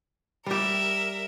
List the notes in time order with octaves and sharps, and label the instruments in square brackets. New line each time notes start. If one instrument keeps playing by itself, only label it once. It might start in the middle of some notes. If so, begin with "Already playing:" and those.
[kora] G3 G4 [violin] A#4 E5